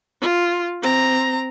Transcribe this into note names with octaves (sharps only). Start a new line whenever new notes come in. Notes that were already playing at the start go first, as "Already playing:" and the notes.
F4
C4 A#5